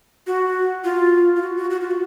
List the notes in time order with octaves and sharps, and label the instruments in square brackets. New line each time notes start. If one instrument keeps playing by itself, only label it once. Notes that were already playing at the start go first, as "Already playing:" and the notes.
[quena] F#4
F4
F4
F#4
F#4
F#4
F4
F#4